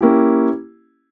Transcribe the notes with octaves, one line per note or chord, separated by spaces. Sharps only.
A#3 C#4 E4 G4